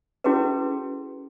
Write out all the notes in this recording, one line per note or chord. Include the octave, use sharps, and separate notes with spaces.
C#4 E4 F#4 G#4 A4 B4